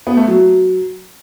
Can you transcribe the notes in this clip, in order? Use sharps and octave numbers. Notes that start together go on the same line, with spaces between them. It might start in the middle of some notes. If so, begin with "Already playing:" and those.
B3
A3
F#3